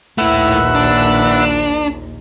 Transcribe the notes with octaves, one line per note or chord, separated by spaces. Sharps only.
A#1 D#2 A#2 A3 E4 B4 E5 F#5
D4